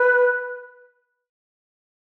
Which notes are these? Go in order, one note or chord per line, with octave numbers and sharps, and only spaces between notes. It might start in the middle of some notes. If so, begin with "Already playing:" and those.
Already playing: B4